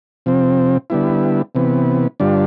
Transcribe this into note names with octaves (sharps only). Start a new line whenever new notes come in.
C3 F3 C4
D3 G3 B3 E4
C3 E3 B3
G2 D3 G3 D4 F4